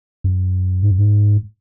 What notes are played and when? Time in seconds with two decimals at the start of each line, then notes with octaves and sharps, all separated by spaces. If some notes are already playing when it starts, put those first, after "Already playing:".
0.24 F#2
0.83 G#2
0.91 F#2
0.98 G#2